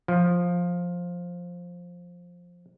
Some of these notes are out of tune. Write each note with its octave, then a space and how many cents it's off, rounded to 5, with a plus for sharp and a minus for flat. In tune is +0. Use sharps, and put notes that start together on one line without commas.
F3 +10